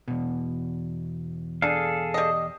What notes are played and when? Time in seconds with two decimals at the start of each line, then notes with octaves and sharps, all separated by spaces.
0.08 E2 B2
1.62 D4 G#4 A4 F5
2.14 G3 D#5